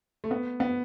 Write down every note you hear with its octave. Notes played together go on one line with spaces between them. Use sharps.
A3
B3
B3